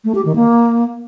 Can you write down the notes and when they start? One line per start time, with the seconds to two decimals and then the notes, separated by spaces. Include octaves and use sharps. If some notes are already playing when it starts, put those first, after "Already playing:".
0.04 A3
0.15 G4
0.25 D#3
0.36 A#3